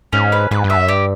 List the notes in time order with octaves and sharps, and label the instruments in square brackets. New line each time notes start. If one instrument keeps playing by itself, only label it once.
[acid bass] G#2 [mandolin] C#4
[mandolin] B4
[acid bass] G#2 [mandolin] B4
[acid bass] G2
[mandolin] E5
[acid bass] F#2
[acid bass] G2 [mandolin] G4